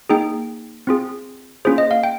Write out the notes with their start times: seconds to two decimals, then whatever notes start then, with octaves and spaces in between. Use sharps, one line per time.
0.09 A#3 D#4 G#4 G5
0.87 C4 F4 G#4
1.65 A#3 C#4 F4 G#4 C5
1.78 D#5
1.91 F5
2.03 G5